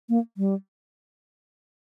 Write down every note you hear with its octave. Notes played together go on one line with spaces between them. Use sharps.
A#3
G3